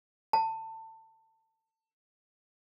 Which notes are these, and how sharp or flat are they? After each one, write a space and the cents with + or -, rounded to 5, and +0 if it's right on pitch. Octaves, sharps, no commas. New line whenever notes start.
A5 +25